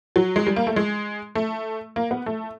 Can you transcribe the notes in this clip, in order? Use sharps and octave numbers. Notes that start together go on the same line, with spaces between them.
F#3
G#3
G3
A#3
A3
G#3
A3
A#3
B3
A3